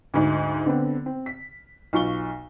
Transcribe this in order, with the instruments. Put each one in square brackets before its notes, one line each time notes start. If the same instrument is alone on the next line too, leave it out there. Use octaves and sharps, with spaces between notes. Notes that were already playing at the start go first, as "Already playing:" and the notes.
[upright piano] D2 G#2
D3 B3 C4
C4
B6
B1 F4 C#6 G7